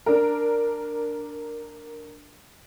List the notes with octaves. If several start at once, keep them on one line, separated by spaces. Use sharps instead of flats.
D4 A#4